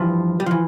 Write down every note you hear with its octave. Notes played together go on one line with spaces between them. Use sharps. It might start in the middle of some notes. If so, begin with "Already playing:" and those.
Already playing: G2 E3 F3
G3
E3 F3